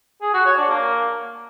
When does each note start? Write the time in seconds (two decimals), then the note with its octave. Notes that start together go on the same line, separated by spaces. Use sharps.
0.22 G#4
0.34 F#4
0.46 C#5
0.57 D4
0.69 A#3